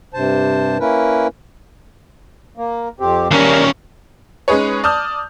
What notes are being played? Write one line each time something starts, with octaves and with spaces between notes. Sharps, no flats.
G2 C3 C5 A5
A#3 C#4 E4 A#4 B4
A#3
F2 C4 G4
D#2 G3 C#4 A#4
G#3 C#4 D#4 G#4 B4 C#5
D5 A5 D#6 F6 G6